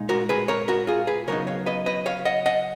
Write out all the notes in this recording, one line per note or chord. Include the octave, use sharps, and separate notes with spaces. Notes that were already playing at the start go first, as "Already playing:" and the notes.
Already playing: A#2 G#3 D#4
F#4 A#4
G#4 B4
A#4 C#5
F#4 A#4
F4 G#4
G#4 B4
C#3 F#3 B3 D#4 A#4 C#5
C#5 F5
B4 D#5
B4 D#5
C#5 F5
D#5 F#5
D#5 F#5